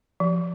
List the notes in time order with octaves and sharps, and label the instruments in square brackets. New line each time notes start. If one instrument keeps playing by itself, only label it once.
[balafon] F3